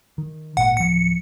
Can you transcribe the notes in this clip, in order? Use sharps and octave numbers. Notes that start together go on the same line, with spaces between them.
D#3
G#1 A#2 F#5
D1 F3 C#7